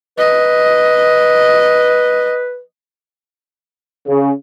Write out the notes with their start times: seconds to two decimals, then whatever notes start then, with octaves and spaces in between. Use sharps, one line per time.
0.18 B4 D#5
4.07 C#3